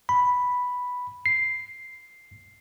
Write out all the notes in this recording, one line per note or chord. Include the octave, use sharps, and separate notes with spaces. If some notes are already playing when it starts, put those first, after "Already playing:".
B5
C7